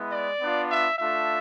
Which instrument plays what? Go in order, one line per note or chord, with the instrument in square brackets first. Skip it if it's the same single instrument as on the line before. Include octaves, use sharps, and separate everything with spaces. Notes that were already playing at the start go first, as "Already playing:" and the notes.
Already playing: [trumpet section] G#3 B3 E4
D5
B3 D4 F4
E5
A3 D4 F4 E5